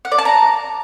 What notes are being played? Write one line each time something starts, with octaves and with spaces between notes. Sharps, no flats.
F#5
D5
A5
A#5